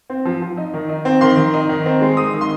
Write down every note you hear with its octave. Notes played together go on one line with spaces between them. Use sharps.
C4
F3
F3
D#4
D#3
D#4
C4
D#3 C6
D#3
D#4
D#3
C4
G#3
D#4 D#6
D#3
C6